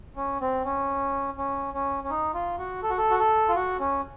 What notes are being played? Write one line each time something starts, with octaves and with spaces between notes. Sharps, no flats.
C#4
C4
C#4
C#4
C#4
C#4
D#4
F4
F#4
A4
F#4
A4
F#4
A4
F4
F#4
C#4